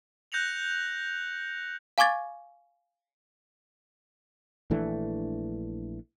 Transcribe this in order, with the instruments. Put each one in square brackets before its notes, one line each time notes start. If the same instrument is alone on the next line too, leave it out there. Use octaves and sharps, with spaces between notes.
[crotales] F#6 G6 A#6 C#7 F7 F#7
[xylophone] F5 G#5 C#6 D6 G#6 A6
[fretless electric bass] A#1 E3 A3 D4